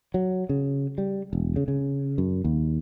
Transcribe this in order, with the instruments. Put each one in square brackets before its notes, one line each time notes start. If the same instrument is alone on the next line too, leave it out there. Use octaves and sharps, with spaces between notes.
[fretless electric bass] F#3
C#3
G3
E1
C#3
C#3
F#2
D#2